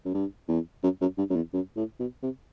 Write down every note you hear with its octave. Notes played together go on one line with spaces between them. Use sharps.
F#2
G2
E2
F#2
F#2
G2
F#2
E2
F#2
A2
B2
C3